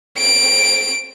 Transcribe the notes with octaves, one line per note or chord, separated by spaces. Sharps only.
D7